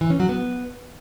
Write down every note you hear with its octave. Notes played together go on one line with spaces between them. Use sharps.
E3
C#4
F#3
B3